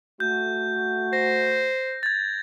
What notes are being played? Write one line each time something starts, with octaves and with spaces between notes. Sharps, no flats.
A3 F#4 G6
C5 A#6
G#6 A6